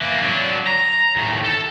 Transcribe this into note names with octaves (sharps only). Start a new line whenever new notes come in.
E3 A#3
F#3 D4
A#5
D#2 A2
A4